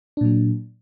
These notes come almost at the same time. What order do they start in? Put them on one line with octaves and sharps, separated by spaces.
D4 A#2 F#3